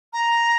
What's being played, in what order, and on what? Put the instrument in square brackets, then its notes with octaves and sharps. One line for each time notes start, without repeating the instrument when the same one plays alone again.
[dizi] A#5